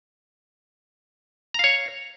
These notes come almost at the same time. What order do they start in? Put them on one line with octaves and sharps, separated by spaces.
A#5 F5 C#5